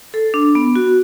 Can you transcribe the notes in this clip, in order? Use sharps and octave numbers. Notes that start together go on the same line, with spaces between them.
A4
D4
B3
F#4